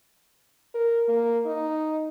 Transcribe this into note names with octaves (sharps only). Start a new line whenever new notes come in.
A#4
A#3
D#4